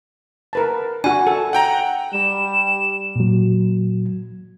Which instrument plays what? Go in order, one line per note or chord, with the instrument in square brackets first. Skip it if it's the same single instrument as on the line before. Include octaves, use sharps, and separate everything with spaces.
[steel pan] A#4 B4 A5
[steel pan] D4 F#4 [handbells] G#5
[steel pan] A4
[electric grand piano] F#5 G5 A#5
[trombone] G3 [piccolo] E7
[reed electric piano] A#2 F#3